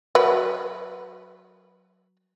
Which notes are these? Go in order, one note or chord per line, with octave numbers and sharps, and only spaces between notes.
F#3 B4